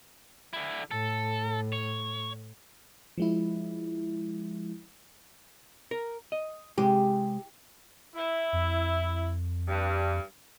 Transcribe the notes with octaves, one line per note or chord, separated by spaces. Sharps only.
D3 E4
A2 A4
C#5
F3 G#3 E4
A#4
D#5
C3 G#3 G4
E4
F2
G2